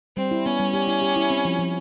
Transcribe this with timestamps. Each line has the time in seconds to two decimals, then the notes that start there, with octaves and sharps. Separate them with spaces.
0.17 G3 C4
0.31 E4
0.46 B3 C#4
0.60 G3
0.74 G4
0.87 E4
1.02 G4
1.16 E4
1.30 C4
1.45 F3
1.59 F3